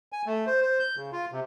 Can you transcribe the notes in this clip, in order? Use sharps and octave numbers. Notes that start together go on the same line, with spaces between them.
G#5
A3
C5
C5
G6
C#3
F4
C3